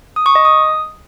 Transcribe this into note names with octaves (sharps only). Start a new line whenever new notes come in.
D#6
C#6
D#5
D#6